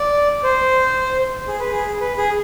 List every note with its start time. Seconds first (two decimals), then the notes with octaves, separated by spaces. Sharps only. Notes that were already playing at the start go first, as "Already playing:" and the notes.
Already playing: D5
0.43 C5
1.48 G#4
1.60 B4
1.72 G#4
2.01 B4
2.18 G#4